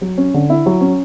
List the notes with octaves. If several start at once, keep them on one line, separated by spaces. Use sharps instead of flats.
F#3
C#4
D3
E4
F#3
C#4